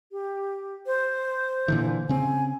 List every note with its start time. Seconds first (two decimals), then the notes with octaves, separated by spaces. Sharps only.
0.12 G4
0.86 C5
1.68 A#2 D3 E3
2.09 C#3 C4 G#5